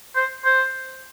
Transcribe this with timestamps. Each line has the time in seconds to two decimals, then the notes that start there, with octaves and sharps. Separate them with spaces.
0.16 C5
0.45 C5